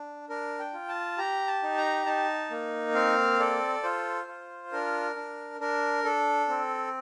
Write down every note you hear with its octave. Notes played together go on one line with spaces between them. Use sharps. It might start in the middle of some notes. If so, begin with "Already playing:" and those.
Already playing: D4
D4 A#4
G5
F4
A5
G4 A#5
A5
D#4
A#5
D#4 A5
A#3
C4 F5
A4 D5
F4 C5
F4
D4 A#4
D4
D4 A#4
D4 A4
C4